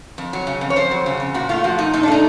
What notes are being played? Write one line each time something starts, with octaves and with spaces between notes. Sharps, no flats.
F2
F#3
C#3
F2
C#5
F2 C5
F#3
C#3
F2
A#2 F#4
A3 F4
F3 F#4
A#2 D#4
A#2 D#4
D4
A3 D#4